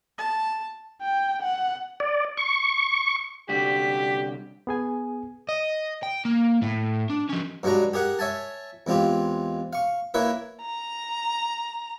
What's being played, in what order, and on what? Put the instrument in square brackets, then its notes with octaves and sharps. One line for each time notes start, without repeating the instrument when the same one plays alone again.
[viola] A5
[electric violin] G5
F#5
[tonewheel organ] D5
C#6
[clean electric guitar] C2 D3 F#4 [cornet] G4 [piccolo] B6
[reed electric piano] B3 G#4 G#5
[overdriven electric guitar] D#5
G5
A#3
A2
D4
F3 C#4
[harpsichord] G2 F#3 G#3 D4 F#4 A#5
G4 G#4 A#4 F#5
C#5 E5 G#5 A5
E2 G#3 C4 F4 G4
F5 C#6
A#3 E4 B4 C#5 E5
[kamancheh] A#5